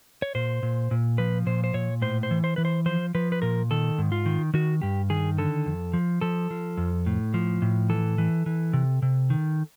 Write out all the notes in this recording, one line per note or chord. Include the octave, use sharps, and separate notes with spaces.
C#5
A#2 C5
A#2
A#2
F3 B4
A#2 C5
C5
A#2 C#5
A2 C5
C5
E3
C5
E3 B4
C5
F3 C5
F3 B4
B4
A#2 A#4
D#3 A4
G#2
F4
D#3
D#3 F#4
G2 G4
D#3 G#4
D3 A4
F2
F3
F3 A4
F3
F2
A2
F3
A2
E3 A4
E3
E3
C3
C3
D#3